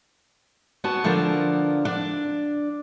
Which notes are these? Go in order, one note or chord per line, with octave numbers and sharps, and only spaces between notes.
B3 F#4 G#5 A5
D3 F3 B3 D4 A4 A#4
D4